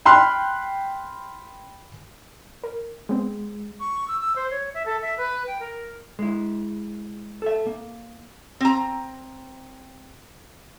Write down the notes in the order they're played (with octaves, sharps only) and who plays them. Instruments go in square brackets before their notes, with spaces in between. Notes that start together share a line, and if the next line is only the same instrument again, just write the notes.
[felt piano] G5 B5 C6 F6 F#6
[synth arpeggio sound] A#4
[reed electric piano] G#3 [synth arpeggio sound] B3 C4
[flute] C#6
E6
E6
C5
C#5
E5
A4
E5
B4
G5
A#4
[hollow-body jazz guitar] G#3 E4
A4 E5
A#3
[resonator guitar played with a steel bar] C4 A#5